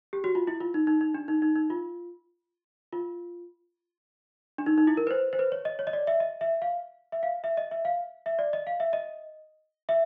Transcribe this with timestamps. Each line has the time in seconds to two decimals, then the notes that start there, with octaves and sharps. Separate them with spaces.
0.13 G4
0.24 F#4
0.35 F4
0.47 E4
0.60 F4
0.74 D#4
0.87 D#4
1.01 D#4
1.14 D4
1.28 D#4
1.42 D#4
1.56 D#4
1.70 F4
2.92 F4
4.58 D4
4.66 D#4
4.78 D#4
4.87 E4
4.97 A#4
5.07 B4
5.11 C5
5.33 C5
5.39 B4
5.52 C#5
5.65 D#5
5.79 C#5
5.87 D#5
5.93 D5
6.07 E5
6.20 D#5
6.41 E5
6.62 F5
7.12 E5
7.23 F5
7.44 E5
7.57 D#5
7.71 E5
7.85 F5
8.26 E5
8.39 D5
8.53 D#5
8.67 F5
8.80 E5
8.93 D#5
9.89 E5